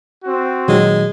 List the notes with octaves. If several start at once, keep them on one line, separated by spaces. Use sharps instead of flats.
C4 F#4
A#2 D#3 F#3 G#3